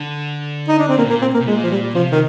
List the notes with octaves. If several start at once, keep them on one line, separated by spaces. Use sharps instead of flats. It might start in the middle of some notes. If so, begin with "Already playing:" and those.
Already playing: D3
D#4
D4
C4
A#2 A#3
A#3
C4
A#3
C3
A#2 G#3
F3
G3
C3 F3
D#3